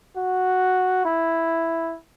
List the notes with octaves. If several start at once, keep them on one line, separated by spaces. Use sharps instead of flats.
F#4
E4